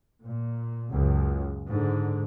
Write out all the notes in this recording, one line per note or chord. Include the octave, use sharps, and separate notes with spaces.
A#2
C#2 F#2
G#2 D3